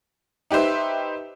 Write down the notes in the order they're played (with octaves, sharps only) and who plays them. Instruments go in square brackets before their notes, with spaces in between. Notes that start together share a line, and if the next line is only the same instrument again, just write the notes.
[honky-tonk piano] D#4 G4 B4 C5 E5